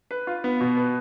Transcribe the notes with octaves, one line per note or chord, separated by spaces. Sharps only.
B4
F4
B3
B2
B4